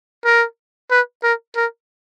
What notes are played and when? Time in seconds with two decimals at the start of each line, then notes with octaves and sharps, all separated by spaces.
0.25 A#4
0.91 B4
1.23 A#4
1.56 A#4